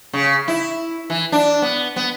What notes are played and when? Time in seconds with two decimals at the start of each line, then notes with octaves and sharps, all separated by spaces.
0.13 C#3
0.48 E4
1.10 E3
1.32 D4
1.62 B3
1.96 B3